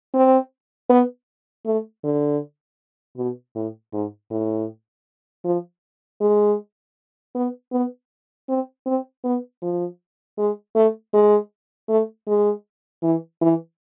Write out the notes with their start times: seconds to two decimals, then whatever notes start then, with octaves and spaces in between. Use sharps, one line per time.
0.14 C4
0.89 B3
1.66 A3
2.04 D3
3.17 B2
3.55 A2
3.93 G#2
4.31 A2
5.45 F3
6.21 G#3
7.35 B3
7.72 B3
8.49 C4
8.86 C4
9.24 B3
9.62 F3
10.38 G#3
10.75 A3
11.13 G#3
11.89 A3
12.28 G#3
13.03 E3
13.41 E3